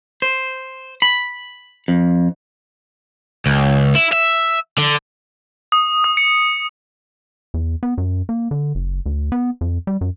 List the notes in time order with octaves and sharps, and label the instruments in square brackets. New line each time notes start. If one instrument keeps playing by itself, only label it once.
[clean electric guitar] C5
B5
F2
[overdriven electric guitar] C#2
E4
E5
D3
[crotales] D#6
D#6
C#7
[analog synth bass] E2
B3
F#2
A#3
D3
F#1
D2
B3
F2
G3
F#2